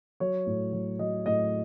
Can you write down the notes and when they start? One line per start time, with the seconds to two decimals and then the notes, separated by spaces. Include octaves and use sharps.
0.20 F#3 C#5
0.47 A2
0.73 F#3
0.99 F#3 D#5
1.26 A2 D#5